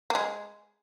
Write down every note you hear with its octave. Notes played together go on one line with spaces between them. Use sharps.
A#3
G#3